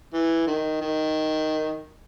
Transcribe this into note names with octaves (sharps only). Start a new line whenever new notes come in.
E3
D#3
D#3